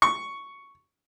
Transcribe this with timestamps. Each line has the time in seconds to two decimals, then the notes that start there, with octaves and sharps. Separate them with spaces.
0.02 C#6